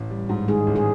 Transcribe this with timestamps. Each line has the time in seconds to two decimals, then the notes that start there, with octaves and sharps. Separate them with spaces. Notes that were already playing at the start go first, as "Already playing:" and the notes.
Already playing: A1
0.10 G3
0.29 G#2
0.48 D#3 G#3 G#4
0.67 A1
0.76 G#3 G#4